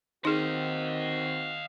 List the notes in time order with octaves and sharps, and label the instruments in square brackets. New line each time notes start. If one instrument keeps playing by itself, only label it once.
[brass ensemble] D#3 C4 F#4 [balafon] D#4 G#4 [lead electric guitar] D#5 F5